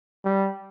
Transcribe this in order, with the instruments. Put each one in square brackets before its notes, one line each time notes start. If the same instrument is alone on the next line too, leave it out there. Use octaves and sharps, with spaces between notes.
[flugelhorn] G3